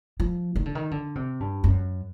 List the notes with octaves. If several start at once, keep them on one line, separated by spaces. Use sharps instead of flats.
F3
D#3
D3
D#3
D3
C3
G2
F#2